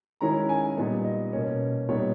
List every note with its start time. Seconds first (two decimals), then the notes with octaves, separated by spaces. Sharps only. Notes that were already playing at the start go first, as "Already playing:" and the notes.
0.21 D#3 G#3 C#4 E4 A#5
0.49 G#5
0.77 A#2 G3 B3 D#4
1.04 D#5
1.33 B2 A#3 C#4
1.89 A#2 G3 B3 D#4 C#5